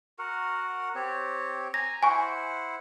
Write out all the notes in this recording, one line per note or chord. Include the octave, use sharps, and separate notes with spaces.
F#4 A#4 F#5
C4 G4 C#5
G#5 A#5 A#6
E4 C5 F#5 G#5 C#6